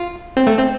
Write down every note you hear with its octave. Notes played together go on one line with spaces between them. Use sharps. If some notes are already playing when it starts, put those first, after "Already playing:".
Already playing: F4
C4
A3
C4